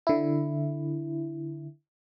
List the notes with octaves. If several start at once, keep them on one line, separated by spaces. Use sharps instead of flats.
D3 E4